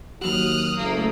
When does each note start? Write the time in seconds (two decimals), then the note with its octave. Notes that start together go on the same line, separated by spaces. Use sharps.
0.21 D#2 F#3 F#4 D#6 F6 F#6
0.77 F#1 A3 A#3